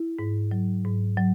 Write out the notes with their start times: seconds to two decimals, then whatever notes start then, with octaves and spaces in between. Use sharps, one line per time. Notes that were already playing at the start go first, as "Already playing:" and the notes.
Already playing: E4
0.19 G#2
0.51 F#3
0.85 G#2
1.17 F#3